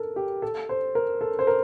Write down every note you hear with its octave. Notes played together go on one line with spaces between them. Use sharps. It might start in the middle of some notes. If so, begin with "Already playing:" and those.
Already playing: A4 A#4
G4
A4
C5
A#4
A4
C5
A#4